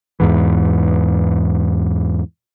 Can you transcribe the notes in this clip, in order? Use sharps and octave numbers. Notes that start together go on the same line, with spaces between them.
E2 G#2 E3